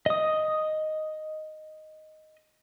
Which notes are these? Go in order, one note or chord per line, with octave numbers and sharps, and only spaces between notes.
D#5 D#6